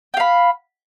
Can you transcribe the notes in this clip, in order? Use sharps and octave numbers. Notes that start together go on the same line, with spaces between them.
F5 G5 B5